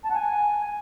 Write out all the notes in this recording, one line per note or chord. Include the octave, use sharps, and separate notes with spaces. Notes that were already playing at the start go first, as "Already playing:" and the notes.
A5
F#5
G#5